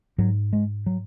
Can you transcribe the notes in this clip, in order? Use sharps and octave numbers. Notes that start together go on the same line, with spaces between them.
G#2 F#3
G#3
F#3